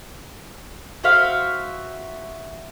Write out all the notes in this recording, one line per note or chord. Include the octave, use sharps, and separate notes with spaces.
F#4 C5 E5 F5